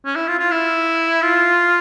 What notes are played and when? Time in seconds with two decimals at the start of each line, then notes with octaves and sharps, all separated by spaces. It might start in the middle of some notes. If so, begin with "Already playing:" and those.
0.05 C#4
0.16 E4
0.28 F4
0.39 F4
0.51 E4
1.22 F4